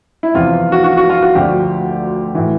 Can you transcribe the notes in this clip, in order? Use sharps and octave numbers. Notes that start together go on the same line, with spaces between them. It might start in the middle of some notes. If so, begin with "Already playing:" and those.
E4
E2 C3 F3 F4
F#4
F#4
F#4
F4
F#4
D2 D3 F3 G4
A2 E3